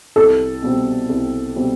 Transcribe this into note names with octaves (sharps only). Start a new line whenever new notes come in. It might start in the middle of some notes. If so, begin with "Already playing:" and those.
C2 A4
B2 G3 C4
C2
B2 G3 C4